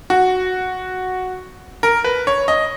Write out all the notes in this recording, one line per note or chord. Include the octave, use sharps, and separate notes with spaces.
F#4
A#4
B4
C#5
D#5